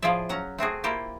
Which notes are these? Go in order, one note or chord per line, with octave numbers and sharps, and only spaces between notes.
A2 F3 F4 G#4 D5 E5
F#3 C#4 F#5 A#5
A3 C4 F#4 G#4
A#3 E4 F4 G4